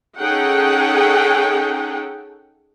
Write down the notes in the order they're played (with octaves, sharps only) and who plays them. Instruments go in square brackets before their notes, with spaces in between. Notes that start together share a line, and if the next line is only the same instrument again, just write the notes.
[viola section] C#4 D#4 G#4 A4 F#5 G5